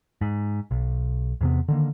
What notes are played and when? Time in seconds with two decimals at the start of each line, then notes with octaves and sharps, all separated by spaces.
0.21 G#2
0.71 B1
1.41 E2 C3 B3
1.68 D3 D#3 A#3